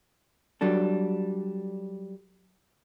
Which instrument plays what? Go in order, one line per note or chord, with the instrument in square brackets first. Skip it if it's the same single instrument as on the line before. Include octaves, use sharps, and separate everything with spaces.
[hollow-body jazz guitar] F#3 G3 D4 A4